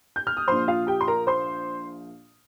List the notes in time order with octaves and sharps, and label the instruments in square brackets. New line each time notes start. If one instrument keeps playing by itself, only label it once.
[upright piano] G6
F6
D#6
A#1 A#2 F3 C5 C6
F4 F5
G4 G5
C6
A#4 A#5
C5 C6